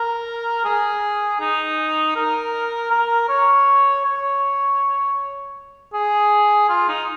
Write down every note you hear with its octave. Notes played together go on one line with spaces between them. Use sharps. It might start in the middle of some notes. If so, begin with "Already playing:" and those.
Already playing: A#4
G#4
D#4
A#4
A#4
C#5
C#5
G#4
F4
D#4